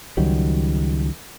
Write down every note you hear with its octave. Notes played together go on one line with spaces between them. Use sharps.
C#2 D#3 F#3 G3